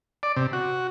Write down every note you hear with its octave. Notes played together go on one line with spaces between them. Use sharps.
D5
C3
F#4